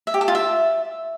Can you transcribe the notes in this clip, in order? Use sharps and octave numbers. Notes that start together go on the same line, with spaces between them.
E5
G4
A4
F4
E5